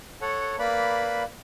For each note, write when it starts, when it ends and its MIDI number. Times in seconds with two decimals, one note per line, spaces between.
0.22 0.56 69
0.22 0.56 73
0.22 0.56 78
0.59 1.23 58
0.59 1.23 71
0.59 1.23 74
0.59 1.23 83